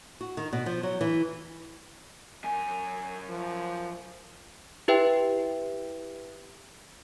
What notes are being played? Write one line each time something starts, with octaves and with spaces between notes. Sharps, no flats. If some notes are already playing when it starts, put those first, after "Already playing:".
F#4
D#3
B2
F3
F#3
E3
F#2 G#5
F3
E4 G4 B4 E5 G5